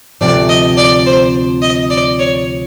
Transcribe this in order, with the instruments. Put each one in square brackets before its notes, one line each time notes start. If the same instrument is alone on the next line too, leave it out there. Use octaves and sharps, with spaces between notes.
[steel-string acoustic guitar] D2 C3 F3 [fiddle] D5
[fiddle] D#5
D5
C5
D#5
D5
C#5